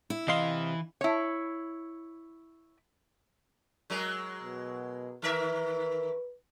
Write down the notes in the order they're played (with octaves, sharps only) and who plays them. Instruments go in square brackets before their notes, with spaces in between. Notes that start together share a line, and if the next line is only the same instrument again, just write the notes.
[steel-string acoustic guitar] E4
[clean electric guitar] C3 C6 [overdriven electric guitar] E3 [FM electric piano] D#5 F5
[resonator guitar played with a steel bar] E4 C#5
[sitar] F#3 G#3 A#4
[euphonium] B2
[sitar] D#3 A#4 E5 [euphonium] B4